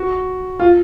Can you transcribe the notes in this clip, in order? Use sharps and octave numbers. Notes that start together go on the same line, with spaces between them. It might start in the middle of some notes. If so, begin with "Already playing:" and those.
Already playing: F#4
F4